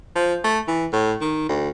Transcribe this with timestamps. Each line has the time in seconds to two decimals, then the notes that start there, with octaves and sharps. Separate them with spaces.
0.16 F3
0.44 A3
0.68 E3
0.93 A2
1.21 D#3
1.49 D2